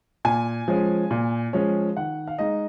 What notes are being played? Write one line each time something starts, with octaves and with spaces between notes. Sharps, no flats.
A#2 G#5
F3 G#3 C#4
A#2
F3 G#3 C#4
D#3 F#5
F5
G#3 D#4 D#5